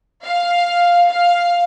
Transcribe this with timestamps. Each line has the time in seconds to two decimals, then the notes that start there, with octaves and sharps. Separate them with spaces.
0.24 F5
1.09 F5